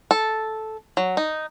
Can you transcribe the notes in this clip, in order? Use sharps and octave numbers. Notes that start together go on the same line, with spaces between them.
A4
F#3
D#4